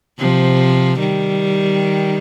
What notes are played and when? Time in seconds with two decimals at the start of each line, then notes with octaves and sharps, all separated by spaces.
0.19 C3 F3
0.99 D#3 G3